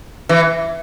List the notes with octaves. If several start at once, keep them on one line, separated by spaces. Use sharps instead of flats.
E3